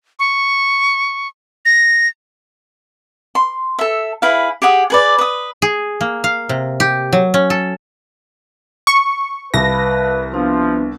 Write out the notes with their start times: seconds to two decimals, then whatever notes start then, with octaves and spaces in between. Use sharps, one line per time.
0.19 C#6
1.65 A#6
3.35 C6
3.79 A4 E5
4.22 E4 G#4 B4 F5
4.62 G4 G#4 F#5 D#6
4.90 G#4 B4 D5
5.18 B4 D#6
5.62 G#4
6.01 A#3
6.24 F5
6.49 C3
6.80 G4
7.13 F#3
7.34 C#4
7.50 A4
8.87 C#6
9.54 C2 B4 F5 A5 A#6
10.32 F3 B3 D4 B4